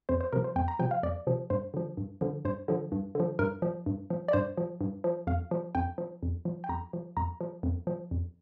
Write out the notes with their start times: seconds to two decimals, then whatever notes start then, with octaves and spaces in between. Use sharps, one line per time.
0.09 F2 C5
0.21 C5
0.33 C3 F3 A#4
0.44 C5
0.56 F2 G5
0.68 A#5
0.79 C3 F3 G5
0.91 F5
1.03 F2 D5
1.27 C3 F3
1.50 G2 C5
1.74 D3 F3
1.97 G2
2.21 D3 F3
2.45 G2 C5
2.68 D3 F3
2.92 G2
3.15 D3 F3
3.39 G2 A#4
3.62 F3
3.86 G2
4.10 F3
4.28 D5
4.33 G2 C5
4.57 F3
4.81 G2
5.04 F3
5.27 F2 F5
5.51 F3
5.75 F2 G5
5.98 F3
6.23 F2
6.45 F3
6.64 G5
6.69 F2 A#5
6.93 F3
7.17 F2 A#5
7.41 F3
7.63 F2
7.87 F3
8.11 F2